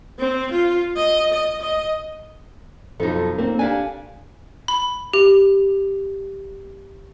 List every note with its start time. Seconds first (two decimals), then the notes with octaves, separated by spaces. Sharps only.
0.19 C4
0.51 F4
0.96 D#5
1.32 D#5
1.61 D#5
3.00 B1 F2 F3 D#4 A4
3.38 A#3 C4
3.59 D4 G4 F5 G#5
4.68 B5
5.13 G4